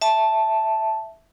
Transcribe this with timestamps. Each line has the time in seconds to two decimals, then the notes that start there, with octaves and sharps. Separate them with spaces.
0.01 E5 A5